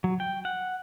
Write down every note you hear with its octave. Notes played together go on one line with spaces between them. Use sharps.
F#3
G5
F#5